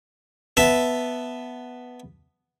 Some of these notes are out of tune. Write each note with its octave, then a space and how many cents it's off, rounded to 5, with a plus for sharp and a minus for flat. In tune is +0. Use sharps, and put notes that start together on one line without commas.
B3 +0 E5 +0 A5 +0